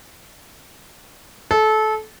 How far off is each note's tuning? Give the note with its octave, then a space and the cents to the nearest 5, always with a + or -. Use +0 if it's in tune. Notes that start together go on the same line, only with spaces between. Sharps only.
A4 -25